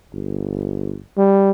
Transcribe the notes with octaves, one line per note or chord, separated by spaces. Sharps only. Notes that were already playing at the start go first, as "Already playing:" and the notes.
G1
G3